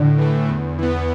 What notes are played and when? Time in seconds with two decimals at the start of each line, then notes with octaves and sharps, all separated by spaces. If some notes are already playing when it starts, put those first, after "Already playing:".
Already playing: A2 D3
0.18 E3 A3
0.49 E2
0.79 E3 B3